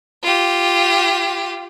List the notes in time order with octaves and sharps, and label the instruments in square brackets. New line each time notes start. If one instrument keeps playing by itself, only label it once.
[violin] F4 G4